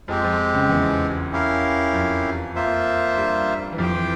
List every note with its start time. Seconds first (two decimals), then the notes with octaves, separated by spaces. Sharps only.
0.08 F2 F3 G#3 C4 G4
0.24 F2 F3
0.54 C#2 C#3
0.69 E2 E3
1.32 C#4 E4 G4 A#4 F5
1.93 F2 F3
2.55 A#3 F4 C5 E5
3.16 G2 G3
3.72 E3
3.78 F2 F3 G4 C5 G5
3.94 E3